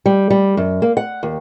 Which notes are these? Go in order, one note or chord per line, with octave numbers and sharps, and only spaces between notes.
G3
G3
F#2
A#3
F#5
D#2